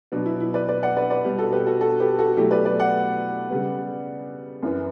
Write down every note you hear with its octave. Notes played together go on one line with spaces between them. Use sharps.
B2 F#3 B3 D4
E4
E4
B4 D5
B4 D5
D5 F#5
B4 D5
B4 D5
B2 G3 B3
F#4 A4
G4 B4
F#4 A4
F#4 A4
G4 B4
F#4 A4
B2 F#3 A3 E4 G4
B4 D5
B4 D5
D5 F#5
C#3 G3 B3
F#2 E3 B3